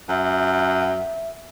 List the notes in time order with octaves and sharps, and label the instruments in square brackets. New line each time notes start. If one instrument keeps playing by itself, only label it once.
[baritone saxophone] F#2 [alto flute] E5